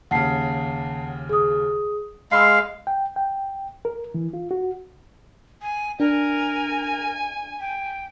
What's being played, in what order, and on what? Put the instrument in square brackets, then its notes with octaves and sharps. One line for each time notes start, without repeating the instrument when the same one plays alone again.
[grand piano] D#2 C#3 [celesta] F#5 A5 C7
[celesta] G#4 D#6
[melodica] G#3 F5 [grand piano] B5 C6 E6 [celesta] C7
[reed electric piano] G5
G5
A#4
E3
F4
F#4
[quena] G#5
[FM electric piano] D4 [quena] A#4 [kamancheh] G#5
[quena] G5